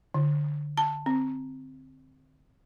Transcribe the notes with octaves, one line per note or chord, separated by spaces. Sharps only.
D3
A5
C4